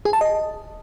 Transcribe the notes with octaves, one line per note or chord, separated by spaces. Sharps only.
G#4
A5
D#5